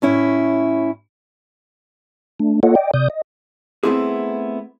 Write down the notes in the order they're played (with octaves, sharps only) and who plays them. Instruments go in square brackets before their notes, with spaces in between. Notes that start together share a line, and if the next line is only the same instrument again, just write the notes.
[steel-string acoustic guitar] A2 C#4 E4
[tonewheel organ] A3 D4
A#3 F4 A4 C#5 D#5 F#5
D5 D#5 G5
C3 D5 D#6 G6
D#5
[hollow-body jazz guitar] A3 B3 C4 E4 G#4